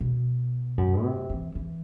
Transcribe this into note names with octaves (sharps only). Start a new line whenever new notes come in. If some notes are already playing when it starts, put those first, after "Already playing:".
B2
F#2
C3
E3
E3